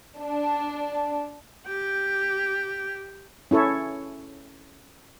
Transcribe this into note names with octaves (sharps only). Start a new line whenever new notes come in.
D4
G4 G5
C#4 E4 A4 C#5